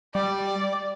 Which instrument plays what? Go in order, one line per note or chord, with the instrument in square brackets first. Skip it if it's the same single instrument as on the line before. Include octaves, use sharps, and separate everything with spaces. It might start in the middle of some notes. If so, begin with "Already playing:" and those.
[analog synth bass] G3 [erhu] D5